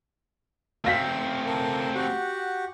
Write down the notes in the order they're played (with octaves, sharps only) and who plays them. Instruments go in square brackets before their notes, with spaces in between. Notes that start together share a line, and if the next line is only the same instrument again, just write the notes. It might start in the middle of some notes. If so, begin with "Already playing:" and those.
[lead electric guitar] A3 C4 [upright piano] F5 A#6 B6 [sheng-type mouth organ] E6
[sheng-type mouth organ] A4 A#4
F#4 G4 F#5